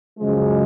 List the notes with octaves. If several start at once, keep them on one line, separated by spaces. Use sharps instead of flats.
F#2 C#3 F3 G#3